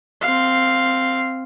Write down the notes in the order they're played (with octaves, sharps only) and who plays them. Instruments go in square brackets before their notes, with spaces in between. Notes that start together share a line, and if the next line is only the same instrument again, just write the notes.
[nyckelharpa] C4 F5